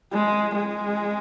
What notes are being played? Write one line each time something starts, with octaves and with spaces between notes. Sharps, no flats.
G#3
G#3